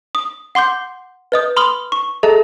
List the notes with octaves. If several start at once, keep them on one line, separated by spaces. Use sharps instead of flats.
D#6
F#5 C6 D6 G6
B4 D#5 D#6 G6
B5 C6 D#6 F6 F7 F#7
C#6
G#4 A4 D#5 E5 A5 A#5